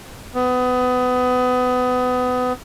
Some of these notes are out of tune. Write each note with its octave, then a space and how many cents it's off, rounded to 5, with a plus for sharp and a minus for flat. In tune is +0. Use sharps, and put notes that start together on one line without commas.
B3 +25